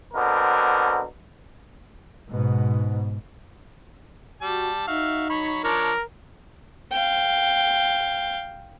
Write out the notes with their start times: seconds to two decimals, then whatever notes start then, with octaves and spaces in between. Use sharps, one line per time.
0.14 B2 D3 C4 A#4
2.31 G#2 B2
4.42 G3 F#4 A5
4.87 D#4 F#4 E5 F5
5.30 F#3 C#5 B5
5.64 F3 D4 A#4 C#5
6.92 F5 G5